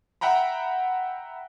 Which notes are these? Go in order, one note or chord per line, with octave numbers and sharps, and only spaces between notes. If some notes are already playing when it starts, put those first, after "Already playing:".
E5 F#5 G5 A#5 B5